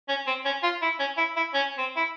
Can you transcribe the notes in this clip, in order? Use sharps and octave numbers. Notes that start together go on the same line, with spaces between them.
C#4
C4
C#4
F4
E4
C#4
E4
E4
C#4
C4
E4